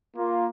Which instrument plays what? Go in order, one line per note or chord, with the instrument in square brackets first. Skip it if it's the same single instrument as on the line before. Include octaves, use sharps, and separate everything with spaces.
[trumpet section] A#3 F4